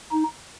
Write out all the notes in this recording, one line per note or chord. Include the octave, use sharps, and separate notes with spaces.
D#4